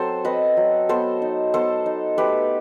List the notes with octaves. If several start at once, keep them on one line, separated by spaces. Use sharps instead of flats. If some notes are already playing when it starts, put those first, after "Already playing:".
Already playing: F#3 C4 A4 C5
C4 B4 D#5
F#3
B3 A4 C5
D#4
B3 A4 C5
D#4
A3 G4 B4